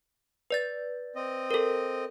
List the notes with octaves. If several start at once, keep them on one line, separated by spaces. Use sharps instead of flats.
B4 D5 A6
C4 D#5
A4 A#4